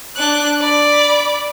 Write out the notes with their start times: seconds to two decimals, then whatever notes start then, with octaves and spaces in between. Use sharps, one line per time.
0.16 D4 F#6
0.61 D5 B5